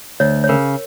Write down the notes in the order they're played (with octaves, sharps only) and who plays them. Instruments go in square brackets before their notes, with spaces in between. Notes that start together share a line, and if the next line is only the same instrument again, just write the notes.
[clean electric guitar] D2 [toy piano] C#5
[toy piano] C#5
[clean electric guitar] C#3 [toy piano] A#4